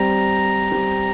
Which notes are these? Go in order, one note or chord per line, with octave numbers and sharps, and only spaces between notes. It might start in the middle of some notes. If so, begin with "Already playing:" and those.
Already playing: G3 C4 G4 A#5
G3 C4 G4